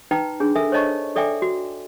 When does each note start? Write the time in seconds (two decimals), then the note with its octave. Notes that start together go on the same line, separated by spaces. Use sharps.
0.11 D#4 B4 G5 A#5
0.40 D4 G#4
0.55 A4 A#4 E5 G#5
0.72 C5 C#5 D#5 A5 C#6
1.16 A4 D5 E5 G5 G#5 D6
1.42 F#4